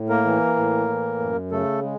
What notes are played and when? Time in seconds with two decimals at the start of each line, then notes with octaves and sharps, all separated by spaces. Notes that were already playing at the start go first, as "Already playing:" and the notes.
Already playing: A2
0.09 A#3 A#4
0.25 E3
0.57 A2
0.89 E3
1.20 F#2
1.51 C#3 A3 A4
1.83 G#3